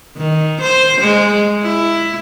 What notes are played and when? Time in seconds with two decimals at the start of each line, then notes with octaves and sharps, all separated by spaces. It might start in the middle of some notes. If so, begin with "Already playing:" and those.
0.17 D#3
0.61 C5
1.00 G#3
1.62 E4